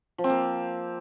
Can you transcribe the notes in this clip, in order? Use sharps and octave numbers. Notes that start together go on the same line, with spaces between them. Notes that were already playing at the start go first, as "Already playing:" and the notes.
F3
C4
A#3